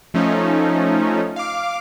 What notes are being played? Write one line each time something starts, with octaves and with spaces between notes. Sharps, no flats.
F3 A3 C#4 D#4
F5 D6